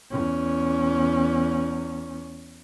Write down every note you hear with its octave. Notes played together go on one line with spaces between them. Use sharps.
E2 C#4